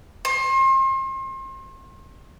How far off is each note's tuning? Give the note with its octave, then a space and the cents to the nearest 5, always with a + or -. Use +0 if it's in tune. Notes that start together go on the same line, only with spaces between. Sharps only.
C6 +35